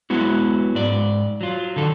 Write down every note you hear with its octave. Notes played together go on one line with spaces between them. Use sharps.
F#3 G#3 B3 E4 F#4
G#2 D5
F#3 F4
D3 D#3 A4